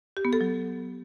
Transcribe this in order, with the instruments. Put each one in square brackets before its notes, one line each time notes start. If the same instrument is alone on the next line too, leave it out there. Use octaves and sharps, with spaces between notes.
[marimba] G4
B3
A4
F#3